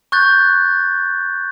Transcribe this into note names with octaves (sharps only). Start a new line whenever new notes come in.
C#6 F#6 G6 A6